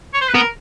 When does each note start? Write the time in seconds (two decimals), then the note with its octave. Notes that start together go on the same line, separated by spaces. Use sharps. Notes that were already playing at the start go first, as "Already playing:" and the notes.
0.14 C#5
0.21 C5
0.28 B4
0.34 B3 A#4